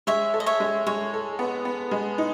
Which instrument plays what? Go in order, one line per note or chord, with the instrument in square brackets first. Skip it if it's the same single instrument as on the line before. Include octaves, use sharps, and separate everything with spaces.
[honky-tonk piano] G#3 [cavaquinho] C#5 E5
[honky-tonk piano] A4
[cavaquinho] D#5
C#5 E5
[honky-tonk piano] G#3
[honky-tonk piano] G#3 [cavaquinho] C#5
[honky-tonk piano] A4
B3
B3
G#3
D#4